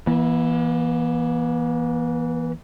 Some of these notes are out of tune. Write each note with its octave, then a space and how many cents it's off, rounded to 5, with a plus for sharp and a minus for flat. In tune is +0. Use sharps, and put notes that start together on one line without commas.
E3 +0 A#3 +45